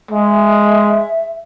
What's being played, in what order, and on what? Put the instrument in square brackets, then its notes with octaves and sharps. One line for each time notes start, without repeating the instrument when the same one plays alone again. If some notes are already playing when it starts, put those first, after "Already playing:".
[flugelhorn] G#3 [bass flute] E5